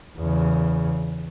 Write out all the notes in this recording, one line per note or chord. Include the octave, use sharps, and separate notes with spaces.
E2 C#3